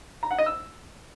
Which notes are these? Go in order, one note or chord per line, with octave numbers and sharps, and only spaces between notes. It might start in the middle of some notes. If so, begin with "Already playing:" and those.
A#5
F#5
D#5
E6